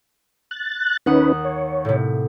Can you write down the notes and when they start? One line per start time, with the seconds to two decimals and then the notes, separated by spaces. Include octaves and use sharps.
0.51 F#6 A6
1.06 D#2 C#4 D#4 B4 F#5 D#6
1.45 C#5
1.85 A2 C3